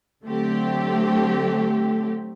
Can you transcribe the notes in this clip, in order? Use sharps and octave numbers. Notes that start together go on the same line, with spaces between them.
D3 F#3 A3 C4 G4